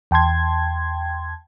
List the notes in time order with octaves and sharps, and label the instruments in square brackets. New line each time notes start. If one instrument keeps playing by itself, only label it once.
[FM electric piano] E2 G5 A5 C6 G#6